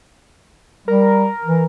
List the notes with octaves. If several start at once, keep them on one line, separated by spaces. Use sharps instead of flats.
G3 A#4
E3